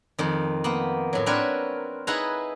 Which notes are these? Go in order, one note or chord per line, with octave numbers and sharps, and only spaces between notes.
F2 D#3
A#3 B3
A2 F#3
C4 D4 F#4 A#4 B4 C#5
D#4 E4 G#4 B4 F#5 A#5